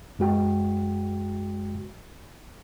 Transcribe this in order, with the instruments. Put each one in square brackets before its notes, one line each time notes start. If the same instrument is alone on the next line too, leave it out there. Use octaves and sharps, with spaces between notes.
[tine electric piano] F#2 G#3 F#4 G5